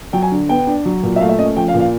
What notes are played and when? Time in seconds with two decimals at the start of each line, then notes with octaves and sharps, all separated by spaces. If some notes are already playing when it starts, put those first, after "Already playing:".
0.13 F#3 G5
0.23 G#5
0.32 D3
0.49 B3 G5
0.67 D4
0.85 F#3
1.03 A#2
1.16 E5
1.20 A3 F5
1.29 E5
1.39 C#4 D#5
1.56 F3 G5
1.68 F5
1.74 A#2
1.80 F5